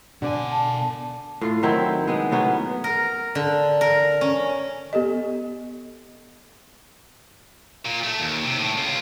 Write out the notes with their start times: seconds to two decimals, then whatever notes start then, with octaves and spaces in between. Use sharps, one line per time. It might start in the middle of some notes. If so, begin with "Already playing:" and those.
0.22 B2 D3 D5 G#5
0.51 A5
1.41 A2 F4
1.63 D#3 F#3 C4 E4
2.07 G#3 B3
2.31 A2 F#3 B3 C#4
2.84 A#4
3.35 D3
3.81 A#4
4.21 C#4
4.93 B3 G4 A4 D#5
7.85 A#2
8.03 A3
8.20 D#2
8.45 C3
8.59 A2
8.78 C#2 F4